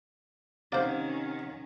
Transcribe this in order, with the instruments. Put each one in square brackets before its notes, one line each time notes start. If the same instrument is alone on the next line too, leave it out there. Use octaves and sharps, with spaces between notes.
[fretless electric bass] C3 [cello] D#3 C#4 [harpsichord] C5 D5 [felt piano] F5 F#5 A#5